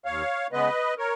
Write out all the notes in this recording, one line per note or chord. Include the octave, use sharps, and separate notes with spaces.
D#2 C#5 F5
C#3 G#3 B3 B4 D#5
A#4 C#5